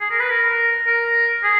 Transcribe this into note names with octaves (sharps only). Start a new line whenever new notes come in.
G#4
A#4
B4
A#4
A#4
G#4